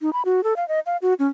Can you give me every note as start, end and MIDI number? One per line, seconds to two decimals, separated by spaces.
0.01 0.13 63
0.13 0.22 83
0.25 0.43 66
0.44 0.56 69
0.56 0.67 77
0.68 0.80 75
0.86 0.97 77
1.02 1.14 66
1.19 1.28 61